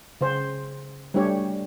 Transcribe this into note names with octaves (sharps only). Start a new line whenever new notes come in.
C#3 C5
G3 A3 D4 G4 C#5